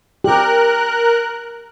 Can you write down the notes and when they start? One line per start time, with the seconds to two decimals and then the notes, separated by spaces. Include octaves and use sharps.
0.24 G4 A#4 F#6